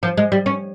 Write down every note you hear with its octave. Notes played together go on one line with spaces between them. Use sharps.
F3
G#3
G3
C#4